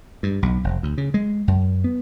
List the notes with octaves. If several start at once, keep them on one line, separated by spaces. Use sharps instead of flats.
G2
B1
F1
D2
C#3
G#3
F#2
B3